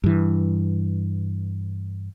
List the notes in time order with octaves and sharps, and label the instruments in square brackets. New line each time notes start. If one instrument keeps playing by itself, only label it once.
[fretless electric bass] G2 E3